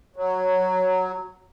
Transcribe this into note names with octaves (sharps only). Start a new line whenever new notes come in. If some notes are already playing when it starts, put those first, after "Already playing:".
F#3